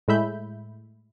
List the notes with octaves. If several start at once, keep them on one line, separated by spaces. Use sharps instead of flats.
A2 G#3 A3 E5 B5 G6